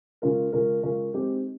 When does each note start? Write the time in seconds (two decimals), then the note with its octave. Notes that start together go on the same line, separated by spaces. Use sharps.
0.22 C#3 G#3 C#4 F4 A#4
0.53 C#3 G#3 C#4 F4 A#4
0.83 C#3 G#3 C#4 F4 A#4
1.14 G#3 C4 D#4 G4